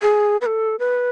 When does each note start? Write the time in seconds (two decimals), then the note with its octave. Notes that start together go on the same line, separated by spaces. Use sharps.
0.02 G#4
0.41 B4
0.46 A4
0.79 B4